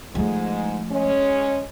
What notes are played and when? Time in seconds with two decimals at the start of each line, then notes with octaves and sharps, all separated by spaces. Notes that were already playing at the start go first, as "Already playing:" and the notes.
0.15 G#2 F3 G#3 A3
0.91 G#3 C#4